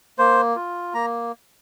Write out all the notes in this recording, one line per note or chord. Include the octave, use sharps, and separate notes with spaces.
A#3 C5
F4
A#3 A#5